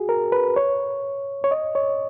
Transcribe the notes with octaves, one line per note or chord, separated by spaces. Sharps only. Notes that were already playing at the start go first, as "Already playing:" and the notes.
Already playing: F#4 G#4
A#4
B4
C#5
C#5
D#5
C#5